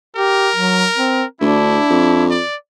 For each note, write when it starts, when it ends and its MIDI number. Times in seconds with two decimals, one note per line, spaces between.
0.16 0.49 67
0.16 1.26 70
0.56 0.86 54
0.97 1.24 60
1.41 1.79 38
1.41 2.33 62
1.41 2.25 64
1.90 2.39 41
2.30 2.56 74